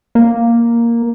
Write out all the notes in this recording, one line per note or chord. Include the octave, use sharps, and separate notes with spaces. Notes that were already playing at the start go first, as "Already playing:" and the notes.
A#3